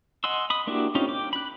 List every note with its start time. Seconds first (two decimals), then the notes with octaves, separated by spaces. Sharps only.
0.24 D#5 F#5 G#5 C6 E6
0.50 B5 D#6
0.67 A#3 D4 E4 F#4 G4
0.95 C4 C#4 D#4 F4 G4
1.08 G5 D6
1.33 B5 F#6